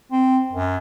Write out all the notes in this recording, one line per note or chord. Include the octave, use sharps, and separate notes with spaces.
C4
F#2